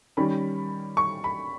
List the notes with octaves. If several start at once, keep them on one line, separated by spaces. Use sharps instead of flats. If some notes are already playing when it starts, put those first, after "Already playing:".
D#3 G3 C#4 B5
C#6
B5